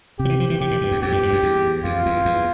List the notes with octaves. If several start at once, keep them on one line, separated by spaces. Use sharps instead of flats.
C3 G4
F3
E3
F3
E3
C3 G4
A2
G2
E2
F2 G4
G2
G2
F2
E2
F2 F4
E2
E2